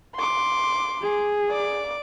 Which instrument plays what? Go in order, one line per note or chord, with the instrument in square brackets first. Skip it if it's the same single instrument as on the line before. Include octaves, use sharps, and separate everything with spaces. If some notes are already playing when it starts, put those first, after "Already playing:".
[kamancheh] C6 D6
[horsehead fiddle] G#4
[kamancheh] D5 D6